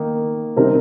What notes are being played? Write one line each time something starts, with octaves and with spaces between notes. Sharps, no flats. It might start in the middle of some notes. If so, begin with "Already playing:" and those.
Already playing: D#3 A#3 D#4
C3 G3 C4 D#4 A#4